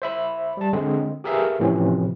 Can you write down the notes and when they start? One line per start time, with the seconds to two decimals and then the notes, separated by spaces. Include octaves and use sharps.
0.02 C5 E5 B5
0.57 G3 A5
0.73 D3 G#3 C4
1.24 G4 G#4 A#4 B4 E5 F5
1.60 A2 C3 E3 F3 C4 C#4